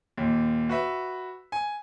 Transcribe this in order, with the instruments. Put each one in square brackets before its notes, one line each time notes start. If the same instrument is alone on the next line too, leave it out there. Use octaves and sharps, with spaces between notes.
[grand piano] D#2 A#2
F#4 B4 E5
G#5